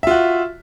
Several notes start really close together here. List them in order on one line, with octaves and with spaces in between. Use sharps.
E5 F4 F#4